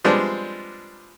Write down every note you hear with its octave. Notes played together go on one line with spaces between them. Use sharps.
F3 G3 G#3 B3 C4 D4